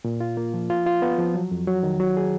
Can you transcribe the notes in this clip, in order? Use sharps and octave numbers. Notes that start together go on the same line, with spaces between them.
A#2
F4
A#3
F3
F4
F4
B3
F3
F#3
F2
F#3
D#3
F#3
G#4